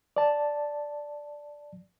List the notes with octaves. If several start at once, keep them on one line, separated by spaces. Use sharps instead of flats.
D5 A5